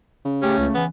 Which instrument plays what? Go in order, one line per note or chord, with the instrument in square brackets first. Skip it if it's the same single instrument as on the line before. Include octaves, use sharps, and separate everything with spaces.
[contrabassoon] C#3
[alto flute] A3 [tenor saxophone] C#4 [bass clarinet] G4
[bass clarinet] C#2
[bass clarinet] E3 [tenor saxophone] B3